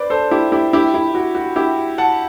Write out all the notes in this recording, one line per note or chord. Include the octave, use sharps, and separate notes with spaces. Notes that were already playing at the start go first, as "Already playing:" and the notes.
Already playing: B4 C5 D5
A4 C5
E4 G4
E4 G4
E4 G4
E4
F#4
F#4
E4 G4
F#5 A5